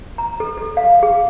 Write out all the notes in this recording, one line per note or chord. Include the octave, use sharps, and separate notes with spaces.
A#5
A4
A4
F5
G#4